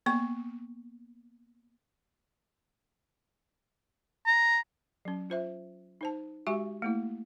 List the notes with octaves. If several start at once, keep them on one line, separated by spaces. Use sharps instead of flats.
A#3 B3 C#6
A#5
F#3 C#4
F4 C5 E5
D#4 C5 A5
G#3 F#4 G4 E5 G#5 C#6
A3 A#3 E4